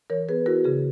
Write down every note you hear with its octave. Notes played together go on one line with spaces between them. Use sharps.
E3 A#4 C#5
B3 G#4 B4
E4 F#4 A#4
C#3 G#4